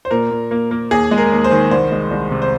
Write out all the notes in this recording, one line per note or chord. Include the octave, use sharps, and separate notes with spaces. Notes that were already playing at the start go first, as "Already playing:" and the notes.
C5
A#2 A#4
A#2
A#3
A#3
D#2 G#4
G#3
A#4
D#2
C5
D#3
C2 C5
G#3
C2
C3
C5